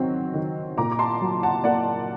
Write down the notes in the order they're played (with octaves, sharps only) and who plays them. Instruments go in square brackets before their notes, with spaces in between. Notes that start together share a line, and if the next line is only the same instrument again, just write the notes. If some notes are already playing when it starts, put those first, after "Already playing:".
Already playing: [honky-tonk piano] D#3 F#3 C4
D#3
A#2 A#5 D6
D6
A5 C6
F#3
F#5 A5
A#3 D5 F#5